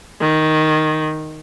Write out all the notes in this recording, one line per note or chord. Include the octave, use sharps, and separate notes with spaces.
D#3